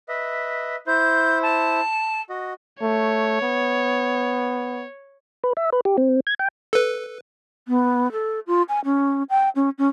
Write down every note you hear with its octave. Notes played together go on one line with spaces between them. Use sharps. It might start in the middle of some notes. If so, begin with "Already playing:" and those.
B4 D#5 E5
E4 C5 G6
A5
F#4 D#5
A3 C#5
B3
B4
E5
B4
G4
C4
G#6
G5
A4 B4
B3
A4
F4
G#5
C#4
G5
C#4
C#4